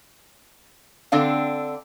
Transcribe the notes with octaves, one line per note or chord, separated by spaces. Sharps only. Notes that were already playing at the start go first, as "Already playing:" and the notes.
D3 C4 D4 F5